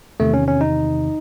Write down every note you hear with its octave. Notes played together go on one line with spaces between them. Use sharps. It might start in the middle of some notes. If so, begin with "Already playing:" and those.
E2 C3 D#3 A3
C#4
C#4
D#4